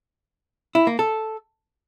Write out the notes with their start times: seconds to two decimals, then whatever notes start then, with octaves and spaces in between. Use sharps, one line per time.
0.75 E4
0.87 A#3
0.99 A4